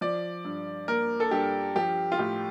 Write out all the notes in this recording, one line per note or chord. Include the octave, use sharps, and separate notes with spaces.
F3 D5
G2
A#3 A#4
A4
G2 G4
F3 G4
F4
A2 G4